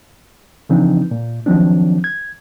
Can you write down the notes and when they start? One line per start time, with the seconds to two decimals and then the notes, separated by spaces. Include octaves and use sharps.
0.69 C#3 E3 F3 C4 D4 D#4
1.11 A#2
1.46 D#3 F3 F#3 C4 D4
2.04 G#6